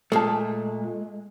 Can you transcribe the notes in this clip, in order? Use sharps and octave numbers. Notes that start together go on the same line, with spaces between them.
A#2 G#3 A3 G#4 A5